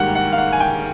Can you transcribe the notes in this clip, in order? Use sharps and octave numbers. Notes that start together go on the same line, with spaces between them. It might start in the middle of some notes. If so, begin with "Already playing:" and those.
Already playing: G#2 D#3 G3 A#3 F#5 G5
F#5
F5
F#5
G#5
G5